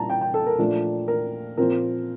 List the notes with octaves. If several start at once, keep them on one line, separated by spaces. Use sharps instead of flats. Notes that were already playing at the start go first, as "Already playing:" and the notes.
Already playing: A#2 G3 A#3 D4 A5 A#5
G5
G5
A4
A#4
A#2 F3 A3 D4
A#4
A#2 F3 C4 A#4